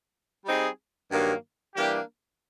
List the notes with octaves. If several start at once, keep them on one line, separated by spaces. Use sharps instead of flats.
G3 C4 D#4 G#4
G2 D#3 F#3 A#3
E3 G3 A#3 D4 G4